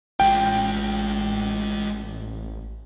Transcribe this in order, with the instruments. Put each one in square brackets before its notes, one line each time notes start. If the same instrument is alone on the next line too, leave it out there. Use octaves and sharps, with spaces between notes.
[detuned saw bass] A1 [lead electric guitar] G#3 F4 [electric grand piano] G5